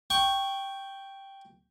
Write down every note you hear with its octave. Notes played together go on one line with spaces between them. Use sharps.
G5 C#6